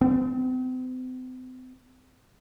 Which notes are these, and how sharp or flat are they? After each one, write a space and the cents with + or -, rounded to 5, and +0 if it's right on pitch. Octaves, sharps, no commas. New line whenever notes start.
C4 -40